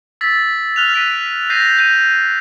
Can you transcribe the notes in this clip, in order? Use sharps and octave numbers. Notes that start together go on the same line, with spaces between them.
E6 A6 B6
F6 F#6 F7
F6 B6 D7 D#7
G6 A#6 C7 D#7
G6 A#6 D#7